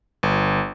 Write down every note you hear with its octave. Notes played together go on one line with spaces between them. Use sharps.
G1